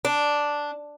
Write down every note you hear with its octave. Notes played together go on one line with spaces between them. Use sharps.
D4